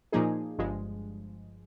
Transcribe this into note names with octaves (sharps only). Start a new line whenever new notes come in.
A#2 F3 A#3 D#4 G#4
G1 G2 F3 G#3